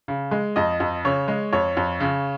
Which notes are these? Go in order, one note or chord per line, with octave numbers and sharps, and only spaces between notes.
C#3
G#3
F2 D#5
F2
C#3 C#5
G#3
F2 C#5
F2
C#3